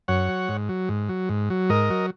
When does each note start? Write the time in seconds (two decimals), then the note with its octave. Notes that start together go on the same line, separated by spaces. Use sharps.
0.08 F#2 C#5 F#5
0.29 F#3
0.49 G#2
0.69 F#3
0.89 G#2
1.09 F#3
1.29 G#2
1.50 F#3
1.69 G#2 A#4 D#5
1.90 F#3